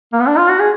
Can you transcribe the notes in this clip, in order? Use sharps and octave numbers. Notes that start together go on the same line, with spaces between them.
A#3
B3
D4
F4
F#4
G#4